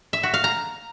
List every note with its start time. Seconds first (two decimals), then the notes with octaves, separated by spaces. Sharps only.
0.13 E5
0.23 F#4
0.34 F5
0.44 A#5